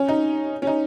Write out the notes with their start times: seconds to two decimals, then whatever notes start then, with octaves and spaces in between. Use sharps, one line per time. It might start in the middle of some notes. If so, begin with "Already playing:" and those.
Already playing: C#4
0.08 D#4
0.62 C#4
0.67 D#4